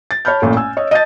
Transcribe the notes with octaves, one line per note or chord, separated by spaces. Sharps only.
A6
C#5 A5 B5 F6 G6
A1 A#2 A3
G#5 E6
C#5 D#5
D#5 A5 G6 A6